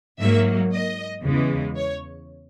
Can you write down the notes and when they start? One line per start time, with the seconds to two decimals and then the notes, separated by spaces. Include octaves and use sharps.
0.20 G#2 F#3 A#3 E5
0.73 D#5
1.24 E2 C#3 E3 G#3
1.76 C#5